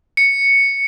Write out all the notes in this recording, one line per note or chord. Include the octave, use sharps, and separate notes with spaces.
C#7